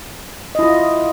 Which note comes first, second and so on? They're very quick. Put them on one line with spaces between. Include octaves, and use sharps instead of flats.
D#5 E4 F4